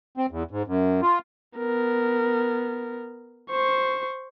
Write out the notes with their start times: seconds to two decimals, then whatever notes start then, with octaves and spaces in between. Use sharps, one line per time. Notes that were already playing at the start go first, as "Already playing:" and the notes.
0.17 C4
0.31 E2
0.51 G#2
0.67 F#2
1.02 F4
1.58 B3 A#4
3.51 C5 C#6